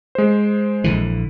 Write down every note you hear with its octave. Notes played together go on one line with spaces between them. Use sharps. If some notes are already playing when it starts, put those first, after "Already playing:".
G#3 C5
A#1 D3 E3